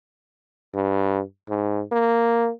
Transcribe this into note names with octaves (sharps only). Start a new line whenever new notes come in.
G2
G#2
A#3